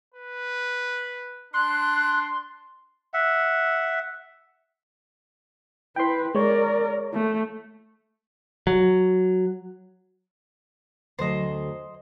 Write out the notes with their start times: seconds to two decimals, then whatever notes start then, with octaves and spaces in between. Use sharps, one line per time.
0.14 B4
1.54 D4 C6 F#6
3.14 E5 F#5
5.96 E4 B4 G5 C6
6.35 G#3 A#4 C#5 D5
7.13 A3
8.67 F#3
11.19 D2 F#3 C5 D#5